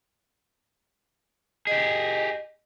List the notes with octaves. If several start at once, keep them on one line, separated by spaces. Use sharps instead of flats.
G4 G#4 D#5